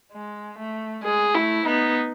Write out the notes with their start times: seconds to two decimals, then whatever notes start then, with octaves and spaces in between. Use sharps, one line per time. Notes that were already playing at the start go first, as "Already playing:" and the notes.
0.12 G#3
0.58 A3
1.04 G#3 G#4
1.35 A3 E4
1.66 B3 D#4